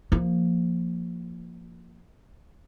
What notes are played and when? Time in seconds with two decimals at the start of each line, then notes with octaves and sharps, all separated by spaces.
0.12 F3 A#3